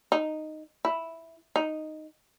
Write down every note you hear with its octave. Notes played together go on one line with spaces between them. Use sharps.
D#4
E4
D#4